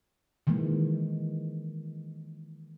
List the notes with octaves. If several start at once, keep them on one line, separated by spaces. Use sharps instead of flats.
D#3 E3 G#3 A#3